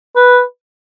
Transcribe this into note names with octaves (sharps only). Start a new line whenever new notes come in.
B4